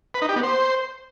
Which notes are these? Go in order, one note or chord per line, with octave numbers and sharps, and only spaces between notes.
B4
D#4
G4
B3
C5